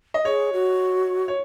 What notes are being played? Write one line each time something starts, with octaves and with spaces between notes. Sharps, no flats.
D#5
G#4 C#5
F#4
C#5